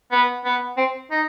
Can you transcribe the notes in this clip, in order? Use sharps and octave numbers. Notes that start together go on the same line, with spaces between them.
B3
B3
C4
D#4